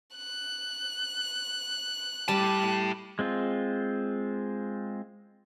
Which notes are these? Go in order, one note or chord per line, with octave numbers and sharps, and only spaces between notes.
F#6
A2 G3 A5
G#3 C4 F4